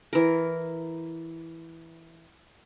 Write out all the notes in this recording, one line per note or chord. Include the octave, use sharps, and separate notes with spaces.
E3 A#4